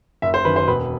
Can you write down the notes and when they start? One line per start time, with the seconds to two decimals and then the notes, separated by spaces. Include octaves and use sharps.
0.22 F#1 E5
0.34 C5
0.45 F#2 D#3 B4
0.56 C5
0.67 E1 B4